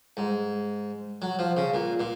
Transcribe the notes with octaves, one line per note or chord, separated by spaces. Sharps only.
G#2
F#3
F3
C#3
A#2
A#2